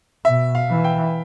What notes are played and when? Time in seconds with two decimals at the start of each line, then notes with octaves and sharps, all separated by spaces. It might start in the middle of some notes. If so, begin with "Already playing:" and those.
0.25 B2 E5
0.55 F5
0.70 E3
0.84 G5